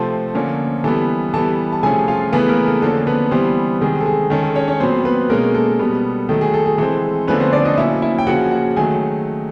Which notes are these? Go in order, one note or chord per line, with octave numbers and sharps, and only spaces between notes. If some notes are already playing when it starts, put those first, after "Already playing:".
Already playing: C3 F3 A3 C4 A4 A5
D3 F3 A#3 C#4
E3 G3 B3 A4 A5
E3 G3 B3 A4 A5
A5
C3 F3 A3 C#4 G#4 G#5
F4 F5
C#3 E3 A3 B3 B4
A#3 A#4
A4
D3 F3 A#3 C#4 A4
B3 B4
E3 G3 B3 C4 C5
C3 D#3 G#3 G#4
A4
G#4
D#3 G#3 C#4 A4
A4
C#4 C#5
C#4 C#5
A#2 F#3 B3 C4 C5
B3 B4
B2 G#3 A#3 C#4 A#4
A4
B2 G3 B3
D#3 F#3 A3 A4
G#4
A4
G#4
E3 G#3 C4 A4
D3 F3 A3 B3 C#4 B4
C4 C5
D4 D5
D#4 D#5
A#2 F#3 A#3 C#4 E4 E5
E4 E5
G5
C#3 F3 A#3 C#4 F#4 F#5
F#4 F#5
D#3 F#3 A3 G#4 G#5